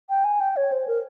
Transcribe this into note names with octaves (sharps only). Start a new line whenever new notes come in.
G5
G#5
G5
C#5
C5
A#4